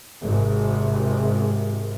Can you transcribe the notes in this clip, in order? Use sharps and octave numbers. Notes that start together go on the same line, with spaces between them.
G#1 G#2 C3